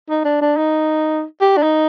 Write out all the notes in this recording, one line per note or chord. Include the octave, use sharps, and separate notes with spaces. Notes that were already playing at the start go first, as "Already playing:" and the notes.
D#4
D4
D4
D#4
G4
D4
D#4